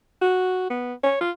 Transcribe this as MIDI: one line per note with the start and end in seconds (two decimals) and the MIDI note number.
0.21 0.67 66
0.70 0.93 59
1.04 1.20 73
1.21 1.31 65